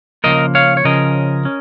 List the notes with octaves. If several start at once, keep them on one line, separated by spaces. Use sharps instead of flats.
C#3 F3 A#3 A#4 D#5
C#5 F5
C#5
C#3 F3 C#4 A#4 D#5
C#4